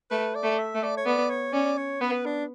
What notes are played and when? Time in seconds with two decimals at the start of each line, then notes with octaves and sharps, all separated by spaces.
0.11 A3 B4
0.35 D5
0.43 A3
0.58 E5
0.75 A3
0.83 D5
0.97 C#5
1.06 B3 D5
1.30 C#5
1.53 C#4 D5
1.78 C#5
2.01 B3 B4
2.25 D4